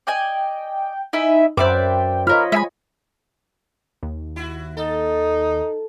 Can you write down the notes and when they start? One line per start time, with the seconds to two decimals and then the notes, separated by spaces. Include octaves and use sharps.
0.07 D5 D#5 G5 G#5
1.13 D#4 E4 E5 G#5
1.57 F#2 B4 C5 D5 E5 G5 D6
2.27 F4 A#4 C#5 D#5 B5 F6
2.52 G#3 E5 G#5 B5
4.03 D#2
4.36 E4 F#4
4.77 D#4 A4